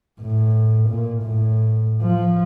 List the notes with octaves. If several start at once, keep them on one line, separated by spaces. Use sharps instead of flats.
A2
A#2
A2
F3